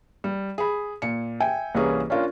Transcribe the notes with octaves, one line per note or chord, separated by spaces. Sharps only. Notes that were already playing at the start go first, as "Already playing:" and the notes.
G3
G#4 B5
A#2 C#7
E5 G5 G#5
C2 E3 A#3 C#4 G#4 B4
C#4 D4 F4 A#4